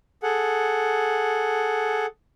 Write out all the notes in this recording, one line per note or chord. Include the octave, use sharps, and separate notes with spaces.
G#4 A4 F#5